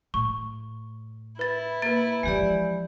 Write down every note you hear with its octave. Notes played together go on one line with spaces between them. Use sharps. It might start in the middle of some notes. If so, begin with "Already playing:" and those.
A2 C#6
E4 B4 A6
A#3 B4 A6
E3 F3 G#3 G4 D5